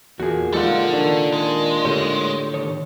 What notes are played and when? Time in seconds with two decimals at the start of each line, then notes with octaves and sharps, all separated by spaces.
0.20 E2 A#2 F#4 G#4
0.54 F3 G3 G#3 D#4 F4 A4 F#5
0.93 D#3 D4
1.33 G#3
1.85 A2 D3 G4 C#5
2.54 D#3 C#5